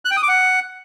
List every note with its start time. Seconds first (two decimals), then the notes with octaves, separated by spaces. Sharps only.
0.05 F#6
0.11 G5
0.17 D#6
0.23 D6
0.28 F#5